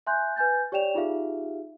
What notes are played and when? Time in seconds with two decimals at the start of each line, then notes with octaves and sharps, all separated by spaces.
0.07 E5 G#5 C6 F#6 G6
0.36 B4 G#5 G6 A6
0.72 G4 C#5 D5 G5 E7 F7
0.94 D#4 F4 G4 G#4 E5 F5